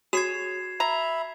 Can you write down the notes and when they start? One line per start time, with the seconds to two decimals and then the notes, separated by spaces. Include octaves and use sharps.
0.13 F#4 G#4 C#5 G#6 C7 E7
0.80 E5 A#5 B5